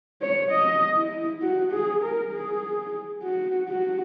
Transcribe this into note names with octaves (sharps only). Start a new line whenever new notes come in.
C#5
D#5
E4
F#4
G#4
A#4
G#4
F#4
F#4